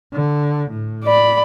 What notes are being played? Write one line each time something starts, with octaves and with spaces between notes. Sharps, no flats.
D3
A2
D5 B5